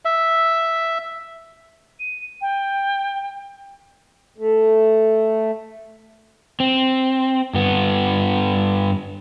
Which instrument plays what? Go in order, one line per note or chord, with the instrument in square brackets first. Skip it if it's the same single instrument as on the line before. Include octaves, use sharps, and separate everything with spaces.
[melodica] E5
[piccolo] D#7
G5
[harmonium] A3
[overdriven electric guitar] C4
G2 B3